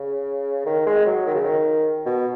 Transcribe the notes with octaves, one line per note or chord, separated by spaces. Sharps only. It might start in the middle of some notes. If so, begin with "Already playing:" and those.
Already playing: C#3
D#3
G#3
F#3
D#3
C#3
D#3
B2